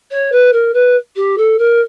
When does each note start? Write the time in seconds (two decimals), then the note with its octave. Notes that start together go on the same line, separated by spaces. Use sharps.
0.11 C#5
0.32 B4
0.53 A#4
0.74 B4
1.16 G4
1.38 A4
1.59 A#4